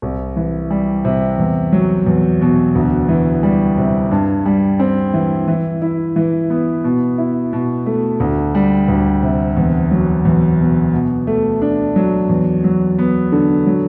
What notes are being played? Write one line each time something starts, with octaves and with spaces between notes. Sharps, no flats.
C2
E3
G3
C3
E2
F#3
E2
B2
D2
E3
G3
C3
G2
G3
C4
E3
E3
E4
E3
B3
B2
E4
B2
A3
D2
G3
D2
C3
E2
F#3
E2
B2
B2
A3
D4
F#3
E2
F#3
B3
D3
F#3